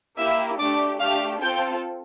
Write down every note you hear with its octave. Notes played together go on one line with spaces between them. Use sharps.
A#3 E4 G4 E5 E6
A3 D4 G4 D5 D6
A3 D4 G4 F5 F6
C4 F4 A4 G5 G6